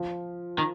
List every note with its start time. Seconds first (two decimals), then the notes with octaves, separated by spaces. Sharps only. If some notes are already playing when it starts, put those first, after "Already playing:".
Already playing: F3
0.58 D#3